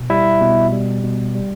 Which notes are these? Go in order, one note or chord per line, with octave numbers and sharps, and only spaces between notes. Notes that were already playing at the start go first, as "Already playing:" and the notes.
Already playing: B2
G3 E4 E5
B2
G3
B2
G3